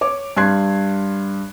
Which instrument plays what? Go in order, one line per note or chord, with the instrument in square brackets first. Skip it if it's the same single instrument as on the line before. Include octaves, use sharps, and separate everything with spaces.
[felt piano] C#5 D6
G2 C6 F#6 G#6 C7